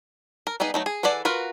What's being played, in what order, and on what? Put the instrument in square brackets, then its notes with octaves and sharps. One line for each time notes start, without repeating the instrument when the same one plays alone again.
[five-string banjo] A#4
G3 B3 D#4 G#4
F#3 A3 D#4
G#4
E3 G#4 A4 D5 F#5
F4 F#4 A#4 B4